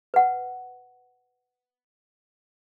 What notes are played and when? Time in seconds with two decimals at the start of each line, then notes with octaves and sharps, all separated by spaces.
0.14 B4 F#5